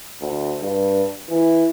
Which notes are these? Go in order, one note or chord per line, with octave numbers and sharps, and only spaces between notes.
D2
G2
E3